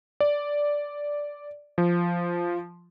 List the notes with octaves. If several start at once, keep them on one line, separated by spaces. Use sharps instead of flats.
D5
F3